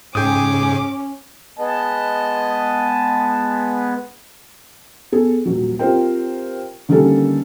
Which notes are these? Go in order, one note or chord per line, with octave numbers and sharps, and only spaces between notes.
G#2 C#3 C#4 G#4 G5 D6 D#6
G#3 B3 D#5 A5
B3 G#4 A4
D#1 F#3
C4 F4 G4 A#4 C5 G5
D3 D#3 G3 A#3 C#4 A4